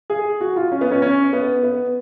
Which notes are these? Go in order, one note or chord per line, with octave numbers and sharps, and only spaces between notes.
G#4
F#4
F4
C#4
B3
C#4
C#4
B3
B3